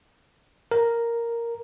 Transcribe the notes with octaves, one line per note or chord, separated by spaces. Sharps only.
A#4